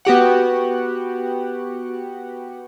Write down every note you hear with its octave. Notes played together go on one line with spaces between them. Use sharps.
B3 F#4 G4 F#5